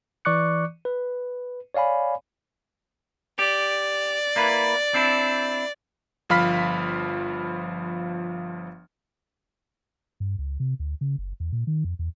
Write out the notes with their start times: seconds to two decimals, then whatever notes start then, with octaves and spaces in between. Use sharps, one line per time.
0.25 E3 D5 C#6 D6 F#6 C#7
0.85 B4
1.74 C#5 D5 F5 G#5 B5
3.39 G4 D5
4.36 A#3 E4 B4
4.94 C4 D4 E4
6.29 G1 F3 F5 B5 F6 B6
10.20 G2
10.38 C#2
10.60 C3
10.80 D2
11.01 C#3
11.18 F#1
11.40 E2
11.52 A#2
11.67 D#3
11.84 F2
11.99 E2